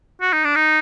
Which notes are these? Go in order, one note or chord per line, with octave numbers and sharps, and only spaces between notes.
F#4
D#4
D4
D#4